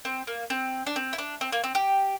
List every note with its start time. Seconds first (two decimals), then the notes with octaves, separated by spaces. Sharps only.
0.05 C4
0.27 A#3
0.50 C4
0.87 D4
0.96 C4
1.13 E4
1.18 D4
1.41 C4
1.52 A#3
1.64 C4
1.75 G4